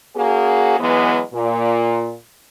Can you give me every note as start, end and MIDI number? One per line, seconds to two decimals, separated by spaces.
0.15 0.75 58
0.15 0.75 61
0.15 0.75 66
0.15 0.75 68
0.80 1.20 52
0.80 1.20 54
0.80 1.20 56
0.80 1.20 59
1.34 2.14 46